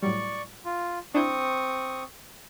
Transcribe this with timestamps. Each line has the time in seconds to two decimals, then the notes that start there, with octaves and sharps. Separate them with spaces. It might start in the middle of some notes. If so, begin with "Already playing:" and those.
0.02 A2 F#3 G3 D5 C#6
0.65 F4
1.15 C4 D4 E4 C#6 D#6 G6